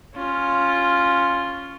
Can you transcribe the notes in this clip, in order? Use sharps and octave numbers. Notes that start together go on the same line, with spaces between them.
C#4 F4